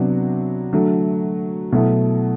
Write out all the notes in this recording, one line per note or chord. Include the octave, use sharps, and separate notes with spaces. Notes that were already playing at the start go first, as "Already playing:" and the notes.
Already playing: C3 F#3 B3 D4 F#4
D3 F#3 A3
B2 F#3 A3 E4